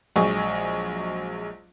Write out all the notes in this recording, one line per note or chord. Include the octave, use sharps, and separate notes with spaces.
A#1 F#3 G#3 D#5 G#5 C#6